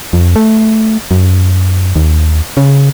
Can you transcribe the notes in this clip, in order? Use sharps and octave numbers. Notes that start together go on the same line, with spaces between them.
F2
A3
F#2
D#2
C#3